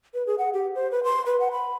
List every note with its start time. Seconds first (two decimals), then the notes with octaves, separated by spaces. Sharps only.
0.14 B4
0.27 G#4
0.38 F#5
0.53 G4
0.75 C5
0.91 B4
1.04 C6
1.26 B4
1.40 F#5
1.52 B5